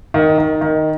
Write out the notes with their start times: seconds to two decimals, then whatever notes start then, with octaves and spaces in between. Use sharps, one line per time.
0.14 D#3
0.38 D#3
0.61 D#3